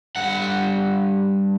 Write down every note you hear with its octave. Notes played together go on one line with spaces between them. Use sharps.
G2 F#5